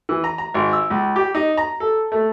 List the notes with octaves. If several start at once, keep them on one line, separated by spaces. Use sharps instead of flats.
E3
A#5
A#5
G#1
E6
C#2
G4
D#4
A#5
A4
A3